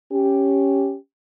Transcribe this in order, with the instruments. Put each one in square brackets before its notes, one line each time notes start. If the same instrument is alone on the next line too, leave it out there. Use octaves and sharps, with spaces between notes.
[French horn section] C#4 G4